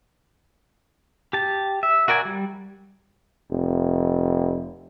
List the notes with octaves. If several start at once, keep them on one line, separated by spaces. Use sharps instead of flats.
G4 A5
E5
F#4 A#4 D5 G5 G#5
G3
F1